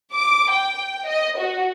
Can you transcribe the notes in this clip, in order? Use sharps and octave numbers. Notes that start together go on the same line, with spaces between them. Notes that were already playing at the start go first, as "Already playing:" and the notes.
D6
G5
D#5
F#4